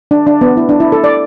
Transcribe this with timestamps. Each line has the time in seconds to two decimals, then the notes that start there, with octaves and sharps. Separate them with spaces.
0.11 D4
0.27 D4
0.41 B3
0.57 E4
0.69 D4
0.80 E4
0.92 A4
1.04 D5